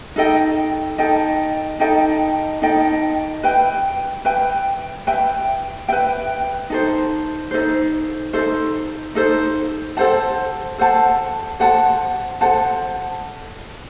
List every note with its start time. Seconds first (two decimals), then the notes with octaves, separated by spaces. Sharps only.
0.16 D#4 A4 D#5 G5
0.98 D#4 A4 D#5 G5
1.80 D#4 A4 D#5 G5
2.62 D#4 A4 D#5 G5
3.43 B4 E5 G5
4.25 B4 E5 G5
5.07 B4 E5 G5
5.88 B4 E5 G5
6.70 D#4 A4 C5
7.51 D#4 A4 C5
8.33 D#4 A4 C5
9.15 D#4 A4 C5
9.97 A4 C5 F#5 A5
10.78 A4 C5 F#5 A5
11.60 A4 C5 F#5 A5
12.41 A4 C5 F#5 A5